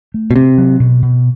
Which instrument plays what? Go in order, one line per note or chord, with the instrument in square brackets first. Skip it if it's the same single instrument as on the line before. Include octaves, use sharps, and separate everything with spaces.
[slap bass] A3
[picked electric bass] B2
[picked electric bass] C3 [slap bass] C4
[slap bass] F#3
B2
B2